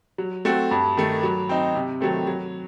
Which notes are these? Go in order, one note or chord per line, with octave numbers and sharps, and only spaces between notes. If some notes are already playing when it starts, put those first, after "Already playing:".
F#3
A3 C4 F#4
G2
D#3 A3
F#3
C4 D#4
C3
D#3 F#3 A3 C4
F#3